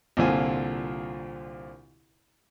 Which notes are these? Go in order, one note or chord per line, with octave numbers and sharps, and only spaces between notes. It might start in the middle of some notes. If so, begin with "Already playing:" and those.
C2 A#2 D3 F4 G#5